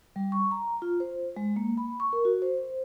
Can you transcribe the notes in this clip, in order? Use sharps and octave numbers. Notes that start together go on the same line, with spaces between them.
G3
C#6
A#5
F4
C5
G#3
A#3
B5
C#6
A#4
F#4
C5